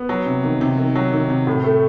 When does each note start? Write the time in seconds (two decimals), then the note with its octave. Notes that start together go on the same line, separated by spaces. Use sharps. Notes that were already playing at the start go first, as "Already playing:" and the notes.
Already playing: B3
0.09 F#3
0.26 C3
0.44 D#3
0.61 C3
0.77 D#3
0.95 F#3
1.13 D#3
1.30 C3
1.47 A2
1.64 A3